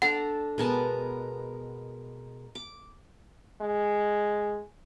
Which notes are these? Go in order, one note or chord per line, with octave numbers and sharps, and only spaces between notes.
D4 A4 D5 F#5 A#5
B2 G#3 B3 A#4 G#5 A5
D6
G#3